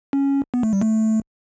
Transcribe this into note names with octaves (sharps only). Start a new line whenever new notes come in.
C#4
B3
A3
G3
A3